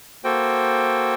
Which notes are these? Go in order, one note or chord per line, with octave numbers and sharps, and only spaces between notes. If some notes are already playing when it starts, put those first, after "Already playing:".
A#3 F#4 A4 C5 G5